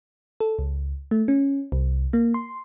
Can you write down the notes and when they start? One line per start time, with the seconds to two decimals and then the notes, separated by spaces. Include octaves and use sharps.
0.40 A4
0.59 C#2
1.11 A3
1.28 C#4
1.72 C2
2.13 A#3
2.34 C6